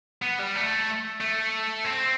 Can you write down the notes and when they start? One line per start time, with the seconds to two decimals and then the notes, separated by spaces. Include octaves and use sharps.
0.22 B3
0.40 G3
0.56 A3
1.21 A3
1.85 C4